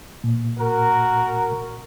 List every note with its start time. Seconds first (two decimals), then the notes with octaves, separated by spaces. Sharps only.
0.24 A#2
0.58 F#4 A#4